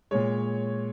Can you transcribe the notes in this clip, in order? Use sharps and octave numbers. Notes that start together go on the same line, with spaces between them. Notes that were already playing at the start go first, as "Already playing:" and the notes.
A#2 G#3 C#5